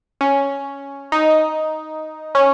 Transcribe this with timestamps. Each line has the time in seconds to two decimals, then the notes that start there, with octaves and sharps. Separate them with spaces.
0.21 C#4
1.12 D#4
2.35 C#4